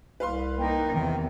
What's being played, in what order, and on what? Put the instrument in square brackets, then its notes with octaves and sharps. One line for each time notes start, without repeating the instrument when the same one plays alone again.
[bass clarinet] C2 [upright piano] B4 F5 C6
[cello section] A#3 D#4 A#4 [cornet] G5
[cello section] E2 C3 [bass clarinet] D#3